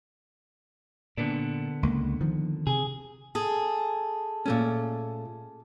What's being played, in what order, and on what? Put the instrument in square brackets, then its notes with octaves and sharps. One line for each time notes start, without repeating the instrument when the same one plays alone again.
[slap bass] A#2 [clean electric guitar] D3 B3 D4
[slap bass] C#2 A#3
D#3 F3
[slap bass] C3 [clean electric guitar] G#4
[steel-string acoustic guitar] G#4 A4
[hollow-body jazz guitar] A#2 A3 C#4